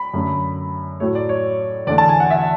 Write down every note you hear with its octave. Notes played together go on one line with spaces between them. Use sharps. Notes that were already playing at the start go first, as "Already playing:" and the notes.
Already playing: B5
F#2 D3 A3
A2 F#3 A3 C#5
D5
C#5
E2 D3 A3 D5
A5
G#5
F#5
E5